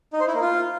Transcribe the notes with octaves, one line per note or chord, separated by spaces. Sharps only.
D#4
C5
E4
A#3
F4